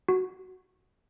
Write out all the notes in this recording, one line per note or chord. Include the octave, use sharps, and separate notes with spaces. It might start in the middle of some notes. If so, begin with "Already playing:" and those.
F#4